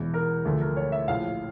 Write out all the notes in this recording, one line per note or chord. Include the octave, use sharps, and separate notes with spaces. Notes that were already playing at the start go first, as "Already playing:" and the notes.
Already playing: E1 E2 E3
A#4
D2 D3 F3 A3
A#4
C#5
E5
A#1 A2 F3 F5